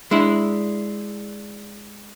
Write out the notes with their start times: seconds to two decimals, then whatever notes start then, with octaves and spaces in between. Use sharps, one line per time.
0.11 G#3 D4 E4